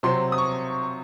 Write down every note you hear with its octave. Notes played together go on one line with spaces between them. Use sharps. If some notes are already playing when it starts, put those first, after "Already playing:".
C3 F#3 C4 C6
D#6
C#6